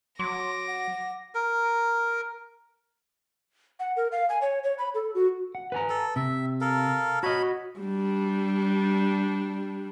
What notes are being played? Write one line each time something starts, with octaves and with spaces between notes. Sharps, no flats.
F#3 C6 D6 A#6
F#5
A#4
F#5
A#4
F5
G#5
C#5
C#5
B5
A4
F#4
F#5
B4 G#5 A#5
A4
C3 E5
A4 A#4 F5
F#4 C#5 D#5 B5
G3 D4